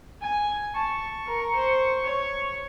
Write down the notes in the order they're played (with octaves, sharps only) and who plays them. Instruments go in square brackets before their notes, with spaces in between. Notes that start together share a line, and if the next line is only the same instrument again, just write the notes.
[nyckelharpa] G#5
[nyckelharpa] A5 [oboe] C#6
[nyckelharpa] A#4
C5
C#5